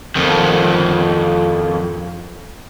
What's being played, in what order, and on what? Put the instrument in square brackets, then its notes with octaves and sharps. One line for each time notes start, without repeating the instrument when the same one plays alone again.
[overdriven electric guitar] F2 D#3